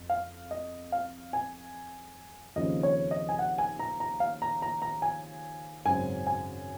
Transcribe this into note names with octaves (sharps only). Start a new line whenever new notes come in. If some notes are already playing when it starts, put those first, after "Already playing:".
Already playing: F2
F5
D#5
F5
G#5
D#2 C#3 F3 C4 D#5
C#5
D#5
G#5
F#5
G#5
A#5
A#5
F5
A#5
A#5
A#5
G#5
G#1 F#2 C#3 F#3 C4 G#5
G#5